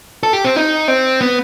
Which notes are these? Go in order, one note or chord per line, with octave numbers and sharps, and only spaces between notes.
A4
G4
C4
D#4
C4
B3